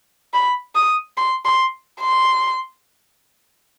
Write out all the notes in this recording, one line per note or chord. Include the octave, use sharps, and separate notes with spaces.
B5
D#6
C6
C6
C6